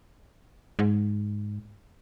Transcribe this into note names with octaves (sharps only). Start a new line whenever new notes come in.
G#2